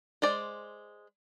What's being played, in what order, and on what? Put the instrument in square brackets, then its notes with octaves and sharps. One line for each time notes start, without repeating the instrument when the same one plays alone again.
[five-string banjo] G#3 C5 D5